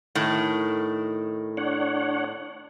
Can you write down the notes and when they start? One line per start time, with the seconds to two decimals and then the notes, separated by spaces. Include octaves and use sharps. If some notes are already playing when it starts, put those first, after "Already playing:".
0.15 A2 D#3
1.57 D4 C#5 F#5